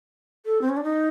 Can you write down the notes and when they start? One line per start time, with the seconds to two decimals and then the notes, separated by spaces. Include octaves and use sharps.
0.46 A4
0.62 C4
0.69 C#4
0.77 D4
0.83 D#4